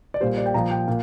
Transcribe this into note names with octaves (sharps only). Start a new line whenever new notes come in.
D5
A#2 G3 C5
D5
G5
A#2 F3 A#5
G5
A#2